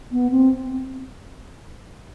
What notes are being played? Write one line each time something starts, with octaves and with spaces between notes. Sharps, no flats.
B3
C4